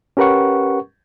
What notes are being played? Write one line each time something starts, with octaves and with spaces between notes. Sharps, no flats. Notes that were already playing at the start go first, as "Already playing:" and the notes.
C#4 G4 A#4 B4 F#5 C#6